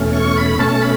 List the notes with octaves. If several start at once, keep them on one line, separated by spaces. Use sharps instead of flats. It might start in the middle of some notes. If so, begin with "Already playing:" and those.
Already playing: E2 B2 A3 C#4
C#6
B5
B2 A3 C#4 A5
B5